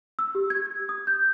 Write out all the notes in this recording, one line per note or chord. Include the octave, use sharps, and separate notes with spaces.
E6
G4
G#6
D#6
G6